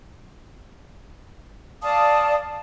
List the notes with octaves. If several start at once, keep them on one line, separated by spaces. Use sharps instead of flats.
D5 F5 A5 D#6